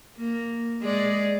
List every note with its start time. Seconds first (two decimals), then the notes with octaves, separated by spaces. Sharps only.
0.17 A#3
0.81 G#3 G#4 D5